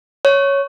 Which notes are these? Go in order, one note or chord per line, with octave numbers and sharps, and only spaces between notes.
C#5